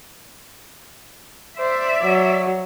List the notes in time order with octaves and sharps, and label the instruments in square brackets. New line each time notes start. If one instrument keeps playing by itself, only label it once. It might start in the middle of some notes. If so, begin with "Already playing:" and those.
[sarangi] C5 [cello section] D5 E5
[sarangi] F#3